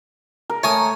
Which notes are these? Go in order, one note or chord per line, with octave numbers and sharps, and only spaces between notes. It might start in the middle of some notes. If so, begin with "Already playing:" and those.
A#4
A3 C#5 G#5 D#6